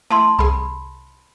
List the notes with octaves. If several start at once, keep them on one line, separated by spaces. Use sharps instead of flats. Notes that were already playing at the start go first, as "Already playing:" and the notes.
A3 E4 A5 C6
C2 G#4 B5